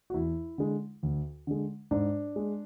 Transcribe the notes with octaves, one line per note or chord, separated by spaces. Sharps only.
F#4
E2 E4
D3 G#3
D2
D3 G#3
G#2 D4
G#3